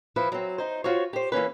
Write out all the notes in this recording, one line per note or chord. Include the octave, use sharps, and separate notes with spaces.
F3 E4 B4
F#3 C4
D#4 C5
F4 F#4 C5 C#5
G4 C5
E3 A#3 C#4 B4